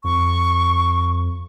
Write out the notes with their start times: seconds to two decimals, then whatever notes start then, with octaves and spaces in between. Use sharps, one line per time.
0.04 F2 C#6